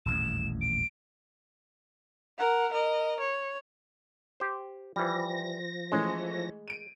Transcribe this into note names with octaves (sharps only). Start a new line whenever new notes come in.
D#1 A1 E2 E7
D7
A#4 F#5
A#4 D#5
C#5
G4 C5
E3 F3 G3 A#6
E3 G#3 A3 C#4
D7 D#7